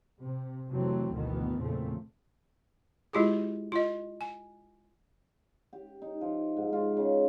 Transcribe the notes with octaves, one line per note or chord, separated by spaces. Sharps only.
C3
F2 C3 E3 F#3 A3 C4
G#1 D2 B2 D#3 E3 B3
E2 A#2 C#3 F3 A3 C4
G#3 E4 F4 G4 G#4
F4 D#5
G#5
G4
D#4
F3
G#2
F4
C#3